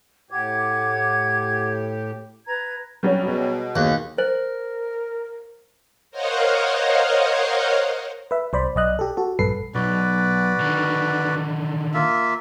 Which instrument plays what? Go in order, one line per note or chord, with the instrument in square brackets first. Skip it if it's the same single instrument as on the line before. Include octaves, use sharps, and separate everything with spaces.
[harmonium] A2 G4 [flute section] F#5 D6 G#6
[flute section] B4 A#5 G#6
[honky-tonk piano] F#3 G3 C#4
[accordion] B2 [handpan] F#4 G#4
[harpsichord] D#2 [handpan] D#3 B3 G#4 [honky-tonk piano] F#6
[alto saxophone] A#4 [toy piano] C5
[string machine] A#4 C5 C#5 D#5 F5 F#5
[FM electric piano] B4 E5
C2 C5 D5 B5
B1 D5 D#5 F#6
G4 A4
F#4 A4
A#1 G2 A4 B4 C7
[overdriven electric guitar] B1 [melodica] F#4 B4 D5
[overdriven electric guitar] D3 D#3
[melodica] A#3 F4 E5